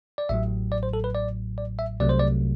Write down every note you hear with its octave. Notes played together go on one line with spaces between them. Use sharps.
D5
A1 A2 F#3 E5
D5
C5
A4
B4
D5
D5
E5
C2 C3 F#3 A3 D5
C5
D5